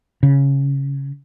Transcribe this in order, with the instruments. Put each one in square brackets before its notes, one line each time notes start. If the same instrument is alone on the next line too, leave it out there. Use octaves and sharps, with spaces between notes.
[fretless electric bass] C#3